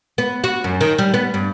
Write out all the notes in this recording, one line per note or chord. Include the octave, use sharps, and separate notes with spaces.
B3
F#4
F#2
D#3
G3
B3
G2